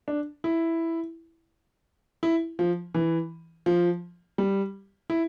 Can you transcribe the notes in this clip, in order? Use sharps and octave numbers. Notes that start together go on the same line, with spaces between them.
D4
E4
E4
F3
E3
F3
G3
E4